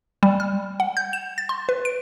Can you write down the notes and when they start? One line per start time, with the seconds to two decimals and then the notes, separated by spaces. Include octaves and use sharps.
0.23 G3
0.40 F6
0.80 F#5
0.97 G6
1.13 E7
1.38 A6
1.49 C6
1.69 B4
1.85 D7